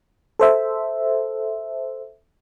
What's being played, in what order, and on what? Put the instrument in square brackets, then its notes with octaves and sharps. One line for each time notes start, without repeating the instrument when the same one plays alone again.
[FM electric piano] A4 C5 E5